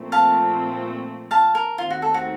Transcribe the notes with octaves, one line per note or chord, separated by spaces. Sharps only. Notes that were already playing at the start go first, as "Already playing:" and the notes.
Already playing: A#2 F3 A3 C4
F5 A5
F5 A5
A#4
D#2 D#3 A3 C4 F4
F#4
A4
F#4